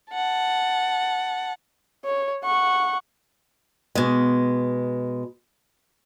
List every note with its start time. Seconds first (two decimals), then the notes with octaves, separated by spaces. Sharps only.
0.11 F#5 A5
2.05 C#5
2.44 F#5 C#6
3.95 B2 G#3